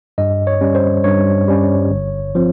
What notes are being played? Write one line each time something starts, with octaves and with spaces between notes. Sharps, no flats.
G2 D#5
C#5
G3 C#4
C5
G2 C#5
G3 C#4
G1
F3 C4